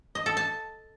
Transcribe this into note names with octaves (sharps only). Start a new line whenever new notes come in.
D#5
A4
A5